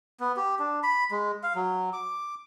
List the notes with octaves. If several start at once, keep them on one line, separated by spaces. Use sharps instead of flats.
B3
G4
D4
B5
G#3
F5
F#3
D6